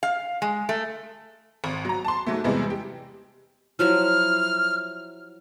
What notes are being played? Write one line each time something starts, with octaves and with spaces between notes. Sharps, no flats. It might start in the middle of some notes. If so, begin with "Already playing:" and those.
F5
G#3
A3
G#1
F#3 A#5
A5 C6
G#2 F#3 A3
E2 C3 E3 G3 G#3
G4
F3 F#3 E4 F6